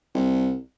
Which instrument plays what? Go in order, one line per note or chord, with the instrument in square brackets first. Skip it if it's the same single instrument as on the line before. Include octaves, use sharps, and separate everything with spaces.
[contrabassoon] C2